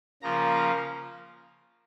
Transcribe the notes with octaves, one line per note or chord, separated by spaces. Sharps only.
C#3 F3 A#3 F4 A#5